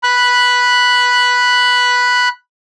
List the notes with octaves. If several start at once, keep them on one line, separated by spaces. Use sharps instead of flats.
B5 F#6